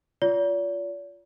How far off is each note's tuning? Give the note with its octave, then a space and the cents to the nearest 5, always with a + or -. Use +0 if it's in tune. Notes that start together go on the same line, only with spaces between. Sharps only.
F4 +0 D5 -45